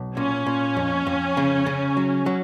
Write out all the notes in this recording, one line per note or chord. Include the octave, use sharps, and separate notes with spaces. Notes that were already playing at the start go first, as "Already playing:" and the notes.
Already playing: B1
A#2 C#4
A#2
F2
F2
C#3
C#3
F#3
F#3